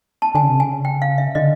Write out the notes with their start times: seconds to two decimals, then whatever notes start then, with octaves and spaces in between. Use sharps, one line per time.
0.22 A5
0.35 D3 G#5
0.43 C#3
0.49 C3
0.57 C#3 G#5
0.85 G5
1.02 F5
1.18 E5
1.35 D3 D#5